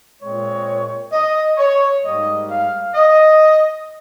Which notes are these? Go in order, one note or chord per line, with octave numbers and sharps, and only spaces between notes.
A#2 G#3 C4 C#5
D#5
C#5
G#2 G3 A#3 D#5
F5
D#5